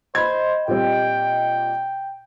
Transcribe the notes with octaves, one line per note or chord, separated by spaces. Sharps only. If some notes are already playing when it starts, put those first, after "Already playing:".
C5 D#5 B5 G#6
A#2 G3 C4 G5